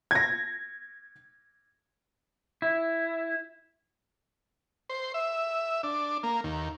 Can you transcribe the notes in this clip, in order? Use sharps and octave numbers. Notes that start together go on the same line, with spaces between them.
G#6 A#6
E4
C5
E5
D4
A#3
D#2